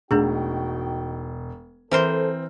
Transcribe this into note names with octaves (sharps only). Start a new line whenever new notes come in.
E1 A3 D4 D#4 F#4 G#4 G5
E3 C4 A4 A#4 C5